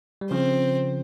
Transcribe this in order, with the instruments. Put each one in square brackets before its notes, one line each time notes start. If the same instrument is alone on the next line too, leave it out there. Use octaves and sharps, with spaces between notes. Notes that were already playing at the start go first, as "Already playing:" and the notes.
[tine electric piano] G3
[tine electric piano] C#3 F3 [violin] C4